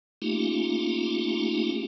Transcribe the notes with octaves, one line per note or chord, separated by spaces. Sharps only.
A3 A#3 C#4 D#4 F4 G4